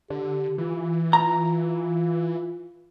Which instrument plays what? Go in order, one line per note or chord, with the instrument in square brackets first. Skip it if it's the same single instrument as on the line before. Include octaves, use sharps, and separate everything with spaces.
[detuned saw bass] D3 [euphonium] G4
[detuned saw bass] E3 [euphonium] F4
[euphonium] F4 [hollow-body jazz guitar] A#5